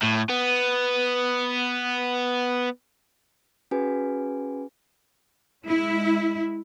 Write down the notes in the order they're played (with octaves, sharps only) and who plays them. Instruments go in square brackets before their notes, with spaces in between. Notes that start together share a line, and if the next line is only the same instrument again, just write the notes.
[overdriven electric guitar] A2
B3
[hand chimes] C#4 F#4 G#4 B4 G#5
[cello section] G#3 E4